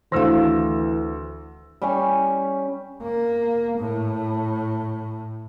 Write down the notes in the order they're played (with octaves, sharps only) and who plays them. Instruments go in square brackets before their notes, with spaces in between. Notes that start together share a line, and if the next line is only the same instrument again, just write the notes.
[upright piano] D2 E6 A#6 [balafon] D#3 E4 F5 [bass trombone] E3
[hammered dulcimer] G3 C#4 G#5
[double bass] A#3
A2